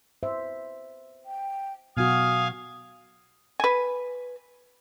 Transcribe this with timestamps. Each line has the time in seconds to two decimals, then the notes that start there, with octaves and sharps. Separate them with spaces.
0.23 C5 E5
1.26 G5
1.97 B2 F#3 F#4 F5 G#5 D#6
3.60 B4 G#5